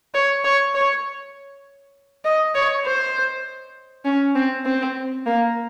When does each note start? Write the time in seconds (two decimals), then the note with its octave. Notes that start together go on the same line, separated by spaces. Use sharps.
0.14 C#5
0.44 C#5
0.74 C#5
2.25 D#5
2.55 C#5
2.85 C5
4.05 C#4
4.35 C4
4.66 C4
5.26 A#3